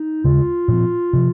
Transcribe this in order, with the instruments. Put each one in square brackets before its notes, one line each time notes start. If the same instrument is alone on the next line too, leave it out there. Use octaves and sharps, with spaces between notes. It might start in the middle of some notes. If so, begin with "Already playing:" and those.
Already playing: [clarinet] D#4
[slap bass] D#2 C#3 G#3 [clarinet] F4
[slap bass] A#2 F3 C4
C3 F3